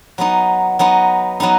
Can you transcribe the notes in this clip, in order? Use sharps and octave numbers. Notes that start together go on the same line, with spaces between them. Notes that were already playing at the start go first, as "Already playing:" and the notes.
F#3 B3 D#4
F#3 B3 D#4
F#3 B3 D#4